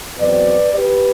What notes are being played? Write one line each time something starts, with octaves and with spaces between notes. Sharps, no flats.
E2 B2 F#3 C4 B4 D5
G4 B4